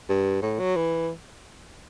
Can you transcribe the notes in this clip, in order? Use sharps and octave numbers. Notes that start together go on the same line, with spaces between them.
G2
A2
F#3
E3